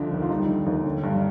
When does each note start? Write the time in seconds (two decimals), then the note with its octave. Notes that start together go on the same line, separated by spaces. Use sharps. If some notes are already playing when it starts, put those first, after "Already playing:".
Already playing: C2 D3 F3 D4
0.12 D#2
0.22 F4
0.30 G3 D#4
0.48 D3
0.66 D#2
0.86 D3
1.03 G2